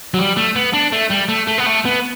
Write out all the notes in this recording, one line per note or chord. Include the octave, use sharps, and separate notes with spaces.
F#3
G3
A3
B3
D4
A3
G3
A3
A3
B3
A3
B3